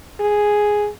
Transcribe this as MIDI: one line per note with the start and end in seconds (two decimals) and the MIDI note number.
0.20 0.88 68